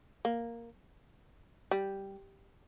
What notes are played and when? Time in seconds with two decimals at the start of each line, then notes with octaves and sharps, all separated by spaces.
0.25 A#3
1.71 G3